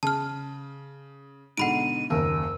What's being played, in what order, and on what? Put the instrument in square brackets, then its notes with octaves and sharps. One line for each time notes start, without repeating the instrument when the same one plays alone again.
[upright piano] C#3 [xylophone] A5 F6
[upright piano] G#2 B2 D3 [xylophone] F#5 B5 D7 [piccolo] D#7
[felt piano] F#1 D#2 [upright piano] A#4 [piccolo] E6